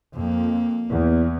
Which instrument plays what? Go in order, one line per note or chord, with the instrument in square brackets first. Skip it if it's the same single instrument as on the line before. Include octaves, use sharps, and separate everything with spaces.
[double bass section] F2 [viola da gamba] A#3
[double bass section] E2